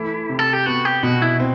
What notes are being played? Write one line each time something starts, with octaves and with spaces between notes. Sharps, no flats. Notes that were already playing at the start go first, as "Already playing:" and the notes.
Already playing: E3 A3 E4
C3
A4
G4
B3 F#4
G4
B2 F#4
E4
C4